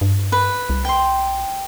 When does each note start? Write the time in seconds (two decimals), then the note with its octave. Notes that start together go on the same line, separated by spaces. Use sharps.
0.01 G2
0.32 B4
0.69 C2
0.85 G5 C6